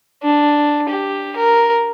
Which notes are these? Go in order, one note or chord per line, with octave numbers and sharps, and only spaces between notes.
D4
G4
A#4